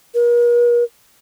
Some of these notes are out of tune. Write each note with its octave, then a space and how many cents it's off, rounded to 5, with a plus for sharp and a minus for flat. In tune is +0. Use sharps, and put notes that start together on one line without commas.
A#4 +45